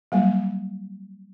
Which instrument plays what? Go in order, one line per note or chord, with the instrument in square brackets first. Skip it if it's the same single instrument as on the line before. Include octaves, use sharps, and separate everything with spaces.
[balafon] F#3 G3 A#3